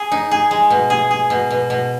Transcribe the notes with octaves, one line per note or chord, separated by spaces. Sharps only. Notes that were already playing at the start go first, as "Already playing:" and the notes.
Already playing: G#4
D#4
G#4
G#3
B2
G#4
G#4
B2
B2
B2